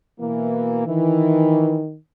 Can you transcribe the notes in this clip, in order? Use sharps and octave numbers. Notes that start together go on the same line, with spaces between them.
B2 E3 A#3
D#3 E3